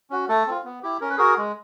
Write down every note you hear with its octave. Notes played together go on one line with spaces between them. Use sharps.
C#4 F#4
A3 A4
C4 F4
B3
E4 G4
C#4 A#4
B4
F#4 G#4 A#4
G#3